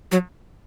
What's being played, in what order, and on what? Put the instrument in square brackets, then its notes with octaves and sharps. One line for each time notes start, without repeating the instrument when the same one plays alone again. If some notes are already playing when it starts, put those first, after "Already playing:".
[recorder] F#3